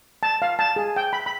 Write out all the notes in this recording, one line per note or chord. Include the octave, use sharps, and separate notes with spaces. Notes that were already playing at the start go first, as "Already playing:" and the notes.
A5
F5
A5
G#4
G5
B5
B5